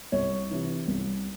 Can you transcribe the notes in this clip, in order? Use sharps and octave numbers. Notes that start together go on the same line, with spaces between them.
C2 C#5
C3 E3
C2